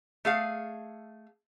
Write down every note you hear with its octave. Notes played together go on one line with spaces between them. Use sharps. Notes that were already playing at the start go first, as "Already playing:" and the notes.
A3 G#4 F5